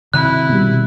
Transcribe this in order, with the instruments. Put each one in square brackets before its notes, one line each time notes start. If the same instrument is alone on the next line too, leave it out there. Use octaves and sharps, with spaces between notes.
[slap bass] C3 D#3 F#3 [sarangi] E4 [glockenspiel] F#6
[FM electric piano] B2 G3